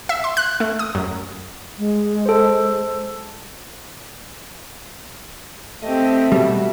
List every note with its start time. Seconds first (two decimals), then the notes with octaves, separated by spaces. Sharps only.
0.09 E5
0.24 C6
0.37 F#6
0.60 A3
0.79 D#6
0.95 F#2
1.78 G#3
2.26 A4 C5
5.83 A3 C4 G4 D#5
6.32 B2 G3 F#4 E5